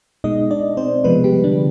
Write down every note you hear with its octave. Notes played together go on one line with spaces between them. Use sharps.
B2 G#3 D#4 D#5
D4 D5
C4 C5
C3 F3 G#3 B3 B4
G3 G4
D3 D4